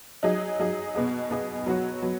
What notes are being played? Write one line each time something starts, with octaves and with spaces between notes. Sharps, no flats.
F#3 D#4 G#4 D#5
F#3 D#4 G#4 D#5
B2 B3 G#4 D#5
B2 B3 G#4 D#5
F#3 B3 D#4 F#4 C#5
F#3 B3